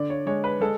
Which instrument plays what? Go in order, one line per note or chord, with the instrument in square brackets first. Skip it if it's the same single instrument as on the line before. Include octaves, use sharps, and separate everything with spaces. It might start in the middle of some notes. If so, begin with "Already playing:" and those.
Already playing: [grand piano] D3 D5
C#5
G#3 C#5
B4
G#3 A4